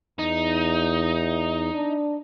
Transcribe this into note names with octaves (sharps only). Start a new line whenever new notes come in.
E2 D#4
D4